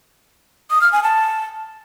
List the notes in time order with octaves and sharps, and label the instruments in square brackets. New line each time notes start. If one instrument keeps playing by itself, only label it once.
[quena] D#6
F6
G#5
A5